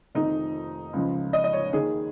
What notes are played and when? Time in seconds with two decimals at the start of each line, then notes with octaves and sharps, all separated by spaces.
0.15 F1 F2 D#3 D#4
0.93 C#2 C#3 F3
1.33 D#5
1.44 D#5
1.53 C#5
1.73 D#2 D#3 G#4